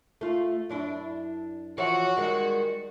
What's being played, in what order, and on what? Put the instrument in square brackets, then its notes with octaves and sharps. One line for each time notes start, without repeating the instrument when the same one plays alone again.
[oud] A3 F4
F#2 D4 E4
[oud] E3 F3 C#5 [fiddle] F#4
[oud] D#3 G3 G#3